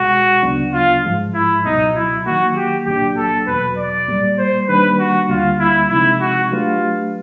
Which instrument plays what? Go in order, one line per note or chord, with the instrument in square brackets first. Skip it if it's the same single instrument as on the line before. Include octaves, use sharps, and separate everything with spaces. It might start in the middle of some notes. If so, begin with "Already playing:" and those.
Already playing: [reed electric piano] C2 B2 G#3 [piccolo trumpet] F#4
[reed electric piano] D2 C#3 F#3 B3 D4
[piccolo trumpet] F4
[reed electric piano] G#2 F3 G#3
[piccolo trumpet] E4
[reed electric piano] C#2 B2 F#3 [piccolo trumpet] D#4
[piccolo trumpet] E4
[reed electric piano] D#3 F#3 A#3 [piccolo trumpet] F#4
[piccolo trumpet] G4
[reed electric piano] C2 A#2 F#3 A#3 D4 [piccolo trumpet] G4
[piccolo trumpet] A4
[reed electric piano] E2 B2 F#3 [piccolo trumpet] B4
[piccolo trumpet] D5
[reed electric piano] A#2 G3 A#3
[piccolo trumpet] C5
[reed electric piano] D#3 G3 A#3 D4 [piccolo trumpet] B4
[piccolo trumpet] F#4
[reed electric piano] D2 D3 G3 A#3 [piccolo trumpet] F4
[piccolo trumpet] E4
[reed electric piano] C3 F3 G#3 C4 D#4 [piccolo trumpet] E4
[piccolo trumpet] F#4
[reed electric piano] F#3 A3 D4 G4 B4 [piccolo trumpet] F4